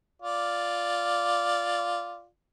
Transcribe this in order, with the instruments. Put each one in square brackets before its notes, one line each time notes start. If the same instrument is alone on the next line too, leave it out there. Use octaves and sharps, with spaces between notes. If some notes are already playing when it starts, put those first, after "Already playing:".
[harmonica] F4 D5